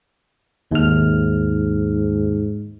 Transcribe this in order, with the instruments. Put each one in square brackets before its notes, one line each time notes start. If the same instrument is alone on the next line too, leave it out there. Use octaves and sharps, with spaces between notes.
[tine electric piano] D#2 F6 [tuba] G#2